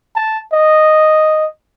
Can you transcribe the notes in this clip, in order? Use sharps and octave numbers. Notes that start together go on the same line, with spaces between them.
A5
D#5